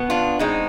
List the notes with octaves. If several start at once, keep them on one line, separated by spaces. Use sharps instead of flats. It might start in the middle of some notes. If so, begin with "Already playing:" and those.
Already playing: B2 B3
D4 F4
B2 G#3 C4 D#4